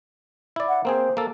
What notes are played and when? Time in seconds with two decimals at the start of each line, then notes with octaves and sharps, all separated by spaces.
0.56 E4 D5
0.68 F#5
0.85 A#3 C4 G#4 C5
1.17 A#3 A4